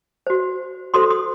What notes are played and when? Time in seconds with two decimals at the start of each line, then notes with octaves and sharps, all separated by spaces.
0.27 F#4 C5
0.94 F#4 A4 C5 C6 D#6
1.10 C6 D#6